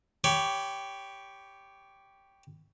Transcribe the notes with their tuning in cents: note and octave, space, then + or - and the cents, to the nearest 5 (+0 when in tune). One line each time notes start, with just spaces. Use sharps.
G4 +0 C#5 +15 B5 +30